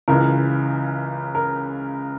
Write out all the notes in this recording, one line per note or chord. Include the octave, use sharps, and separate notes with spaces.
C#2 C#3 E3 A#4
A#4